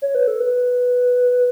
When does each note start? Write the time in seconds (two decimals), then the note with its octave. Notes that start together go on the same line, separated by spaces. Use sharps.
0.02 C#5
0.15 B4
0.28 A4
0.40 B4